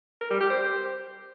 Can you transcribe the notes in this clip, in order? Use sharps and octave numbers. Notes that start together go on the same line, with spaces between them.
A#4
G3
G4
C5